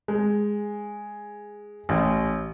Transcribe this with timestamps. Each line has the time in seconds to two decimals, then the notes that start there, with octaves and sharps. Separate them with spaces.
0.08 G#3
1.89 A1